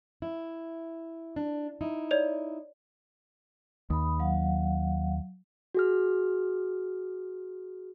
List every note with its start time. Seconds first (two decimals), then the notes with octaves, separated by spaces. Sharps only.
0.22 E4
1.36 D4
1.81 D#4 E4
2.11 C#5 D5 F7
3.90 D#2 B5 D#6
4.19 F#3 F5 F#5
5.75 F#4 G#4 F6